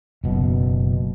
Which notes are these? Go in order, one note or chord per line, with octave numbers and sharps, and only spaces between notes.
F#1 B2